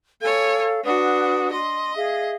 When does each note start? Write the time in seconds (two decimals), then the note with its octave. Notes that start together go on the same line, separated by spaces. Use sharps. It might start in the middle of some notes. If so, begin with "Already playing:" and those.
0.21 A4 C#5 F5 G#5
0.84 D4 F#4 B4 F#5 D#6
1.52 D#5 C6
1.96 G#4 E5 F5